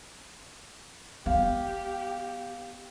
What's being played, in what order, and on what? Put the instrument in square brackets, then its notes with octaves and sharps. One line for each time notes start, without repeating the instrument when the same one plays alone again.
[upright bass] B3 [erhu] G4 [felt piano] F5